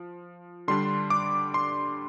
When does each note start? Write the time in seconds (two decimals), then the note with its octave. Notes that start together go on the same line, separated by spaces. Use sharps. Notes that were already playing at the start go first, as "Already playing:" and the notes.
Already playing: F3
0.68 D3 G3 D4 C6
1.10 D6
1.54 C6